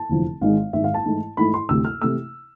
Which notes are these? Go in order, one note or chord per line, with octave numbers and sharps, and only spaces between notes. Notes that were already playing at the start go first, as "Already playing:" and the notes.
Already playing: A5
F1 E2 D3 F3
G#1 G#2 G#3 F5
G#1 G#2 G#3 E5
F5
A5
G#2 E3 A3 E4
G#2 E3 A3 E4 B5
C6
D2 C3 E3 A3 E6
F6
C3 E3 A3 E6